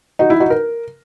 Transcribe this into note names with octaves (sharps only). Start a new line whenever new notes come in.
D#4 F#4
E4
D#4 F#4
A#4